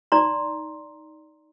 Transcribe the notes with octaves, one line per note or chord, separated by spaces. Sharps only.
D#4 D5 A#5 C6